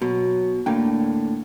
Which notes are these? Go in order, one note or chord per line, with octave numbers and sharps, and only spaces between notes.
B2 F#3
A2 D3 A#3 G5